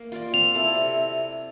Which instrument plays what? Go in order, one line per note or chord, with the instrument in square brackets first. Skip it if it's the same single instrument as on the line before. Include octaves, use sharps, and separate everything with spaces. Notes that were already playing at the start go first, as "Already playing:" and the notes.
Already playing: [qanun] A#3
F4 A#4 D5
[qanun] C4 [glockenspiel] F7
[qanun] E4 A4 D5
C3